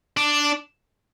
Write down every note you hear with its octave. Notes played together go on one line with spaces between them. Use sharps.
D4